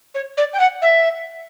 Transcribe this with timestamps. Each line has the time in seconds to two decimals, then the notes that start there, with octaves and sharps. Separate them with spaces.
0.14 C#5
0.37 D5
0.53 G5
0.59 F#5
0.81 E5